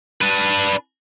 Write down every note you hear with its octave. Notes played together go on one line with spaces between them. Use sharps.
D4 B4